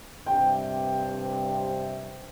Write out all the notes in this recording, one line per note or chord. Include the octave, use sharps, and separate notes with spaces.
G2 C3 G5